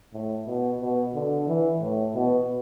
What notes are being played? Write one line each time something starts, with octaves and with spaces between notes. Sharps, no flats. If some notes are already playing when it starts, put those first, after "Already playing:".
A2
B2
B2
D3
E3
A2
B2